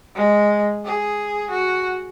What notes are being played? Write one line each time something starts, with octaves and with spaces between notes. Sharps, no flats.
G#3
G#4
F#4